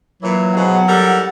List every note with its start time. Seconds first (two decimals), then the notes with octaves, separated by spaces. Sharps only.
0.22 A#2 E3 F#3
0.55 B2 F3 G#3 F#5
0.87 G3 A4 A#4